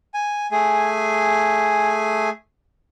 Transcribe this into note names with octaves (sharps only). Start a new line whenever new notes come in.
G#5
A3 G#4 G#5